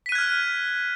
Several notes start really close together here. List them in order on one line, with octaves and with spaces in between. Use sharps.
B6 D#7 F#6 G#6 F6